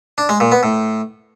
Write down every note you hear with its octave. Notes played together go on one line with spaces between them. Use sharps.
D4
G#3
A#2
B3
A2